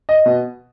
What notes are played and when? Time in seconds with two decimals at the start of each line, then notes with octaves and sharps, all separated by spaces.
0.09 D#5
0.26 B2